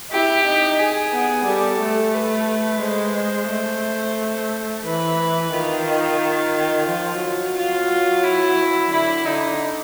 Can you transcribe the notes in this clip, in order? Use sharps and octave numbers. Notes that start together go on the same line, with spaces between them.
E4 G4
D#4
G#4
B3
G3 A4
A3
B4
G#3 C5
A3
E3 B4
D#3 F4
F3
F#3
F4
E4
D3 E4
D3 D#4